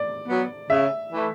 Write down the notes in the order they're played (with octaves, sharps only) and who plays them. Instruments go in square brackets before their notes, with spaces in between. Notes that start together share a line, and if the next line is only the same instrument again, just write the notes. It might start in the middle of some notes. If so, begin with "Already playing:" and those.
Already playing: [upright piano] D5
[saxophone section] F#3 B3
[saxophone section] C#3 [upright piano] E5
[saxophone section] E3 A3